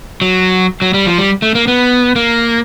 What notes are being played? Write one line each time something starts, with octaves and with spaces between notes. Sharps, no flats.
F#3
F#3
G3
F3
G3
A3
A#3
B3
A#3